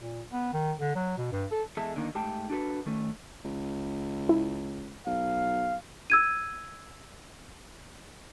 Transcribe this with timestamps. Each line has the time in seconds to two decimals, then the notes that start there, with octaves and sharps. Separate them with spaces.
0.02 A#2
0.33 B3
0.53 D#3
0.80 D3
0.95 F#3
1.18 B2
1.32 G2
1.52 A4
1.77 E2 G#3 A4 E5 A5
1.96 D3 D#3 A#3 D#4
2.15 G#2 A3 G4 G5 A5
2.50 D4 F#4 A4 B4
2.86 D#3 A3 C#4
3.44 C#2
4.29 E4
5.06 B1 F5
6.10 E6 G#6 D#7